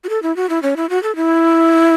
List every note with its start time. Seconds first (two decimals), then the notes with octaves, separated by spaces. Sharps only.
0.04 F#4
0.09 A4
0.22 E4
0.36 F#4
0.49 E4
0.63 C#4
0.77 E4
0.90 F#4
1.03 A4
1.16 E4